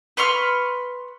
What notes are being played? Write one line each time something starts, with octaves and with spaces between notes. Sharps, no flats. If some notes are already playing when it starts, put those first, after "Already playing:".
B4 C6 C#6 F6